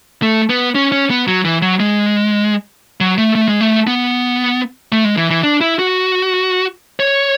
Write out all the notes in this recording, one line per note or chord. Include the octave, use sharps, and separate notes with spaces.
A3
B3
C#4
C#4
B3
F#3
E3
F#3
G#3
F#3
A3
A3
G#3
A3
B3
A3
G#3
E3
E3
D4
E4
F#4
C#5